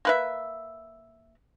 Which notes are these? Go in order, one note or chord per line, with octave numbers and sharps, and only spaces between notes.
A#3 B4 E5